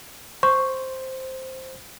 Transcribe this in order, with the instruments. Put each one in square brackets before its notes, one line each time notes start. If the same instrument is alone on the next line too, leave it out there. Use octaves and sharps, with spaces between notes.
[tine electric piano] C5 [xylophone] C#6